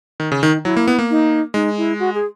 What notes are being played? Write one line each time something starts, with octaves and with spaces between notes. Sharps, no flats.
D#3
C#3
D#3 D#4
F#3 E4
A#3
B3
A#3
D#4
G#3 D#4
E4
F#4
G#4